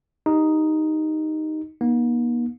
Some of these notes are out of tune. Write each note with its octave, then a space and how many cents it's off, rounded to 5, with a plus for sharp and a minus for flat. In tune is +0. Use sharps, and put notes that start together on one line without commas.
D#4 +0 G4 +0
A#3 +45 D#4 -10